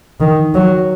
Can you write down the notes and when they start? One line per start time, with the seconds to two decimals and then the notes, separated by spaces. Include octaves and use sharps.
0.20 D#3
0.54 F#3